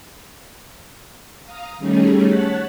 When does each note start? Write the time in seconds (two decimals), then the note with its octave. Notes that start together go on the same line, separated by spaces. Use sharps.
1.43 F5 A#5 D#6
1.78 D#3 G3 A3 C#4 D#4 G#4
2.26 C#5 F#5 A5 F#6 A6 B6